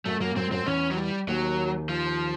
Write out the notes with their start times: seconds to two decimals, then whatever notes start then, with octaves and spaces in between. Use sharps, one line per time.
0.05 F#2 F#3 A3
0.20 F#2 F#3 A#3
0.36 F#2 F#3 C4
0.51 F#2 F#3 C4
0.66 E2 E3 C#4
0.91 F#3
0.97 G3
1.27 D#2 D#3 F#3
1.89 F3